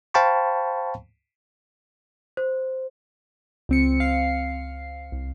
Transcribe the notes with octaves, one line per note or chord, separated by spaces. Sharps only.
C5 F5 G5 A5 B5 C#6
C5
C#2 C4 C#7
F5 C7
C2